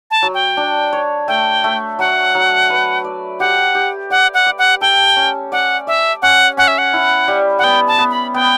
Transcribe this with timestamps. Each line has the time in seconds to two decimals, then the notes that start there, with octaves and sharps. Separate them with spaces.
0.11 A5
0.23 F#3
0.34 G5
0.57 D4
0.93 C#5
1.28 A3 G5
1.64 A3
1.99 F#3 F#5
2.35 F#3
2.70 B4
3.04 D5
3.40 G4 F#5
3.75 G4
4.10 D5 F#5
4.34 F#5
4.46 D5
4.58 F#5
4.81 A4 G5
5.16 C#4
5.52 D5 F#5
5.87 D5 E5
6.22 C#4 F#5
6.57 C#4 F#5
6.68 E5
6.78 F#5
6.93 E4
7.28 G3
7.58 F#5
7.63 B3 G5
7.87 A5
7.99 B3
8.11 B5
8.34 B3 G5